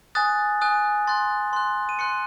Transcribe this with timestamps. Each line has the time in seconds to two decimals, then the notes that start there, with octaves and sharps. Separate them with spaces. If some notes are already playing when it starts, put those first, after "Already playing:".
0.15 G#5 D#6 F#6 A6
0.61 G#5 D#6 F#6
1.07 C6 F#6 A6
1.53 C6 F#6
1.89 D#7
1.99 C6 F#6 C#7